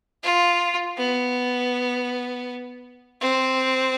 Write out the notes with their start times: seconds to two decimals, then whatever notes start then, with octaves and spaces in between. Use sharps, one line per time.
0.23 F4
0.97 B3
3.21 C4